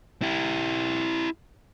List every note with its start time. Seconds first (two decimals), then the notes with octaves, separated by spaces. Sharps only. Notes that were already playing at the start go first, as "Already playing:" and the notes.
0.22 E4 G4